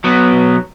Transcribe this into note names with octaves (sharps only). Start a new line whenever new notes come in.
F#3 B3
B1